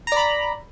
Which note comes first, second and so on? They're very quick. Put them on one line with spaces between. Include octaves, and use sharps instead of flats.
A#5 D5 B5